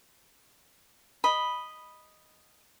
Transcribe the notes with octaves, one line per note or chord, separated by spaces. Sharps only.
D#5 B5